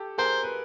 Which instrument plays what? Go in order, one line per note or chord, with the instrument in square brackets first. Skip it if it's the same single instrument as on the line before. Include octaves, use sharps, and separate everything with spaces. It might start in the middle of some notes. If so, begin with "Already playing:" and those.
Already playing: [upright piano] G4 A4
[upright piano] G#4 A#4 [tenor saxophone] C5
[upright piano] B4